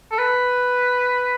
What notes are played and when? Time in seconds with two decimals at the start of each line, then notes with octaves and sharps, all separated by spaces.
0.12 A4
0.18 B4